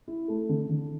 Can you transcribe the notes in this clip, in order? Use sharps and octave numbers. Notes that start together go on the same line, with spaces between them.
E4
A3
D3
D3